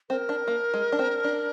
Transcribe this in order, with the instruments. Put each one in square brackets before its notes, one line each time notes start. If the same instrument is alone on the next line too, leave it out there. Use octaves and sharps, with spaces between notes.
[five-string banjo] C4 [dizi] A#4
[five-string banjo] D4
A#3
G#3
D4
C4
D4